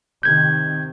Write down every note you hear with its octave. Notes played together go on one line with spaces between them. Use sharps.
C3 D#3 G6 G#6